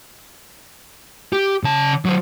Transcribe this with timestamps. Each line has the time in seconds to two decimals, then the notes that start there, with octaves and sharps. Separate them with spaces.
1.33 G4
1.64 C#3 A5
2.05 F#3 C5